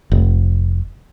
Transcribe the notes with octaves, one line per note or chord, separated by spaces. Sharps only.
F1